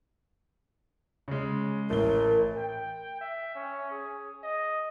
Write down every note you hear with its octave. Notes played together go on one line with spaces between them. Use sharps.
C#3 G#3
A1 A#4 G7
G5
E5
C#4
G#4
D#5